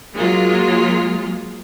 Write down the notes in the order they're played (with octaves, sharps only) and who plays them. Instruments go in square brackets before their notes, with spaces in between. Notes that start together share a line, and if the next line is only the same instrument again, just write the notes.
[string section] F#3 G#3 A#3 F4